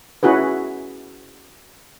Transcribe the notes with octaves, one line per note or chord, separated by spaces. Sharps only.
C#4 E4 F#4 G#4 B4